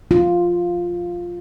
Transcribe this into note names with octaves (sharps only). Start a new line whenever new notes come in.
F4